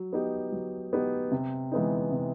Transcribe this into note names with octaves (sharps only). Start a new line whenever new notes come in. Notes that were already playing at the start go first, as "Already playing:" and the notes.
Already playing: F#3
B3 D#4 G4
F#3
B3 D#4 G4
C3
E3 G#3 B3 D#4
C3